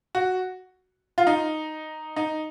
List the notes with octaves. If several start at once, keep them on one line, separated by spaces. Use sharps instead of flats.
F#4
F4
D#4
D#4